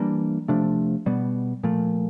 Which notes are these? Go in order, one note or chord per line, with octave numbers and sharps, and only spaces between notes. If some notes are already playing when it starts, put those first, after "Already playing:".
Already playing: E3 G3 A#3 D4
C3 F3 A3 D4
B2 G3 B3
A#2 F3 A3